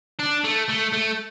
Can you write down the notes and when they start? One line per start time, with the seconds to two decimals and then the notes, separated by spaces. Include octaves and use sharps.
0.19 D4
0.44 A3
0.69 A3
0.93 A3